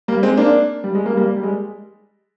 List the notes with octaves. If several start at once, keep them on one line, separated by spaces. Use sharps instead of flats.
G3 A#3
G#3 C4
A#3 D4
G3
G#3
G3 A#3
G3 A#3
G3
G#3